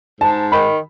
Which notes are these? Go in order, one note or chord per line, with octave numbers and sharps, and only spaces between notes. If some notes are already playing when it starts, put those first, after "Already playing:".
G#2 A5
D#3 B5